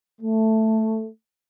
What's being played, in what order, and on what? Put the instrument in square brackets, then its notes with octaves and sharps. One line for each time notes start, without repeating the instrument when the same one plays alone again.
[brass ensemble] A3